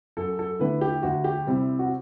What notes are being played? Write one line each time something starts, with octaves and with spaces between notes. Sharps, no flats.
F#2 A4
A4
D3 A3 E4 B4
G4
D2 F#4
G4
C3 G3 C4 E4
F#4